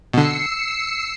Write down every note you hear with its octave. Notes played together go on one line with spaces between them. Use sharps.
B2 D3 E6 C7 C#7